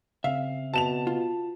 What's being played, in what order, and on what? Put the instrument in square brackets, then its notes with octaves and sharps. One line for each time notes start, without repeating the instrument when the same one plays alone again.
[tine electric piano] C#3 C4 [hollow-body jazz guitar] E5 [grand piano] F5
[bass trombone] B2 [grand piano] A5 E7 F7
[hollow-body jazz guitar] F4